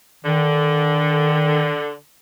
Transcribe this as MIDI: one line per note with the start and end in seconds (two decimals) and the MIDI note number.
0.25 1.92 50
0.25 1.76 51